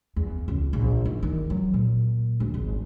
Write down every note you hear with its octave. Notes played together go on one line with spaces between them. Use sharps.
E2
C#2
A#1
D#3
D#3
F#3
A#2
D2
G#1